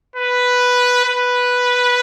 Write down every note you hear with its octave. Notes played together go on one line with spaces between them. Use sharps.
B4
B4